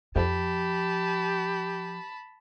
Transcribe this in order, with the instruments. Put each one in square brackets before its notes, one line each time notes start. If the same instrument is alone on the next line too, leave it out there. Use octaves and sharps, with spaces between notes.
[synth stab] F2 [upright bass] F3 [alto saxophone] G4 [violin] A5 B5